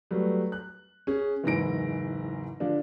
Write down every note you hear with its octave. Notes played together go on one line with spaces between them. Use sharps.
F#3 G3 A3 B4
F#6
C#4 G#4
F#1 E2 G#2 E4 A#6 D7
D3 F3 D4